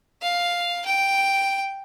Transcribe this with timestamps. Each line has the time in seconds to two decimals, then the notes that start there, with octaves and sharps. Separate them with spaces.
0.22 F5
0.86 G5